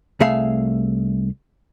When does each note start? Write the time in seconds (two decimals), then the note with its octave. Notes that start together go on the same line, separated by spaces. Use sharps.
0.20 C2 A3 G#4 E5 F5